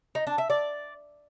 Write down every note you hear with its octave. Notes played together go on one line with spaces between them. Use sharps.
D#4
D4
E5
D5